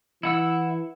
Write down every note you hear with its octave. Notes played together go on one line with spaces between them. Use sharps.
E3 E4 F#5 E6